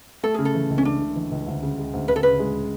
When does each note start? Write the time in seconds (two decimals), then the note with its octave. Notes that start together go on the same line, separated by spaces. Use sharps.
0.23 A3 A4
0.34 C#3 G#4
0.45 A4
0.55 E3
0.70 C#2
0.78 C#4
0.85 A3 D4
1.00 C#3
1.16 E3
1.31 C#2
1.47 D2
1.62 C#3
1.78 G#3
1.93 D2
2.08 D2 B4
2.16 A4
2.23 C#3 B4
2.39 G#3